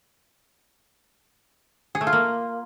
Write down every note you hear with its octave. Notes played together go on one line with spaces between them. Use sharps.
G#4
A3
F4
A#3